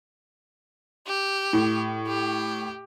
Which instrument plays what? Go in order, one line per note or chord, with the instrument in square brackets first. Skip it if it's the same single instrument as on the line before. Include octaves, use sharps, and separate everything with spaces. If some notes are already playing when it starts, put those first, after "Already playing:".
[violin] G4
[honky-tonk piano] A2
[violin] G4